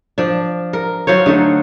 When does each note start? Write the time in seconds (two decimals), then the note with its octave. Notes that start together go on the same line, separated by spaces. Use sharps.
0.18 F3 D4
0.73 A#4
1.07 F#3 F4 C5 C#5
1.26 D3 A3 D#4